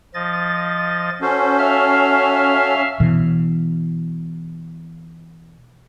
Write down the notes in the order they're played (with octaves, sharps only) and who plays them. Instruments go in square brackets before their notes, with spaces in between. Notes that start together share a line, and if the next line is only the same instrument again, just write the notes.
[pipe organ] F3 D#5 A6
[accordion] C#4 [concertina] F#4 A4 [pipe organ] C5
[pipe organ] E5 F5 F6
[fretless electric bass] B2 E3